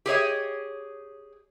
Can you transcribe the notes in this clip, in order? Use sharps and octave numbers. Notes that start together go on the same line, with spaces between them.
G4 G#4 C#5 D#5